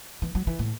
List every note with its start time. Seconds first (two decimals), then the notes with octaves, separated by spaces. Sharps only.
0.22 E3
0.35 F#3
0.47 E3
0.59 A2